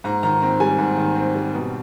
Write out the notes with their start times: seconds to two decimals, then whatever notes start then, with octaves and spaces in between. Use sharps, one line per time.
0.04 G#2 A#5
0.23 D#3 A#5
0.42 C4 A#5
0.60 G3 G#5
0.78 G#2
0.98 D#3
1.16 C4
1.35 G3
1.54 B2